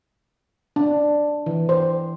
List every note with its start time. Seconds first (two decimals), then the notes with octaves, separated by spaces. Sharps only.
0.76 D4
1.46 E3
1.69 C5